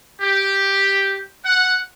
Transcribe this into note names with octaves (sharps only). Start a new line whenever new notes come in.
G4
F#5